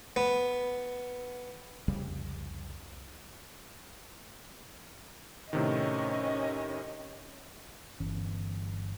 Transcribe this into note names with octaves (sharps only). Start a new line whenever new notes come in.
B3
C2 F2 C#3 G3
A2 C3 D#3 C#4 D#5
G1 E3 C#4